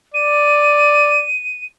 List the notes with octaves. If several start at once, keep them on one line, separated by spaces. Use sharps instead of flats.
D5 D#7